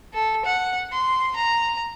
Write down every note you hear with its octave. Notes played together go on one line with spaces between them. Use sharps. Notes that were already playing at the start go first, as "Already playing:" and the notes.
A4
F#5
C6
A#5